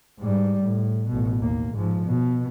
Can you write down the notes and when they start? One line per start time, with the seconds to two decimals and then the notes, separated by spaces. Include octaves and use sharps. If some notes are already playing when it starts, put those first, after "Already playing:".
0.19 G#2 G3
0.62 A2
1.09 A1 B2
1.40 D#2 A#3
1.74 G#2 F3
2.06 B2